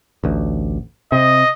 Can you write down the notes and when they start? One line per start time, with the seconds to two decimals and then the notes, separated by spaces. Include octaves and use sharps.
0.24 A1 D2
1.12 C3 D#5